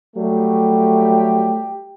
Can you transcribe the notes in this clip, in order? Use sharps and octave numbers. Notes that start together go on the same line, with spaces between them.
F#3 G3 A3 G4